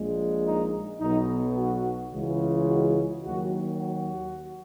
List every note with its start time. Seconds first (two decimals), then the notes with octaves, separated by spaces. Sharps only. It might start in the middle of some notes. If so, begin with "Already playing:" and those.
Already playing: A#1 A#2 G#3
0.45 D#4
1.00 B1 B2 F#3 D#4
1.56 F#4
2.12 C#2 C#3 E3 G#3
2.69 F#4
3.24 D#2 D#3 F#3 F#4
3.79 F#4